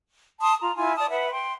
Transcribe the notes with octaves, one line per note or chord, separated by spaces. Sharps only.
A5 C6 D#6
F4 A#5
E4 F4 G#5
D5 A5 D#6
B4 E5 F#5
G5 C6